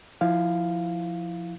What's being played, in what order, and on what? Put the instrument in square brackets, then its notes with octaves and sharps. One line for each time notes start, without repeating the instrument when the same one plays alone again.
[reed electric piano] F3 E4 F5